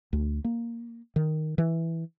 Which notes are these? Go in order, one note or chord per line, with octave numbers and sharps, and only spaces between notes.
D2
A#3
D#3
E3